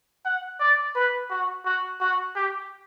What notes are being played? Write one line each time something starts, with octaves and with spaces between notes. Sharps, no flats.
F#5
D5
B4
F#4
F#4
F#4
G4